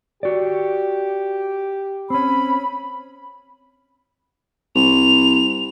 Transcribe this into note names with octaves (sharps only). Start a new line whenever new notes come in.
F#4 G4 D5
C4 C#4 B5
C2 F7